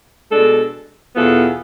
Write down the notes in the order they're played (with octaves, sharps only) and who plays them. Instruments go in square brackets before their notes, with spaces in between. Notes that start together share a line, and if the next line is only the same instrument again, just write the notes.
[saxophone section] B2 G#3 D4 A4
E2 B2 B3 F4 A4